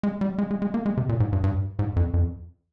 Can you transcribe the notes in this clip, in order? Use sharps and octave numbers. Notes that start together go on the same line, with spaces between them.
G#3
G3
G#3
G#3
G#3
A#3
G#3
C3
A#2
G#2
G2
G2
G#2
F2
F2